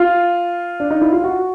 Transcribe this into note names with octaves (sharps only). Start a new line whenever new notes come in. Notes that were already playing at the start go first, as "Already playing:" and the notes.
Already playing: F4
D4
D#4
E4
F4
F#4